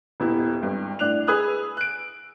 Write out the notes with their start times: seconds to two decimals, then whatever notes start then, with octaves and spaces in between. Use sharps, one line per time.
0.20 D#1 B2 E4
0.61 G#1 G2
0.99 A2 D4 F#6 F7
1.27 G#4 B4 D#6 E6 F#6
1.77 F#6 D7